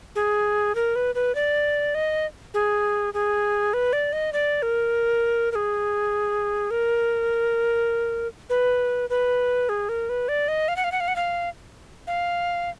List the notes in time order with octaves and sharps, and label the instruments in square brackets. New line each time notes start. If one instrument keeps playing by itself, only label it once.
[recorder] G#4
A#4
B4
B4
D5
D#5
G#4
G#4
B4
D5
D#5
D5
A#4
A#4
G#4
A#4
B4
B4
G#4
A#4
B4
D5
D#5
F5
F#5
F5
F#5
F5
F#5
F5
F5